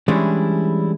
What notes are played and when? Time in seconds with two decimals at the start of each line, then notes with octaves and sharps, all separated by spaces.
0.08 E3 G3 G#3 C#4 D4 E4